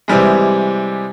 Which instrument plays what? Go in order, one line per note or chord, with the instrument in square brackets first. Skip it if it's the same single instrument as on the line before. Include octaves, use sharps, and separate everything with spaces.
[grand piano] C3 E3 G3 G#3